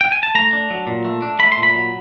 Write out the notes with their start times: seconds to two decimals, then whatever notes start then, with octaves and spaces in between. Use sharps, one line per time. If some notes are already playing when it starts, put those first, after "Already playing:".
0.01 G5
0.12 G#5
0.23 A5
0.35 A3 A#5
0.53 D4
0.70 F#3
0.87 A#2
1.05 A3
1.22 D4
1.39 A3 B5
1.52 C6
1.57 A#2
1.63 B5
1.74 F#3